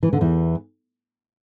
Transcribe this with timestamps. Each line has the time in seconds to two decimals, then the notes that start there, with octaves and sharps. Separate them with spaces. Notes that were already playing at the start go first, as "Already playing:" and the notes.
0.03 E3
0.13 D3
0.21 E2 E3